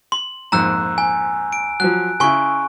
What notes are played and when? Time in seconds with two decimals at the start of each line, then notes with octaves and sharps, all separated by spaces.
0.12 C6
0.52 A#1 F2 G#2 A#5 E6 F#6
0.98 G#5
1.53 D7
1.80 F3 F#3 F#6
2.20 C#3 E4 G#5 C6 C#6